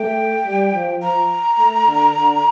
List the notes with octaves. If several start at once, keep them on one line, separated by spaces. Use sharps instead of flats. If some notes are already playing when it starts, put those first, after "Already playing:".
Already playing: A3 G5
G3
F3
F3 A#5
A3
D3
D3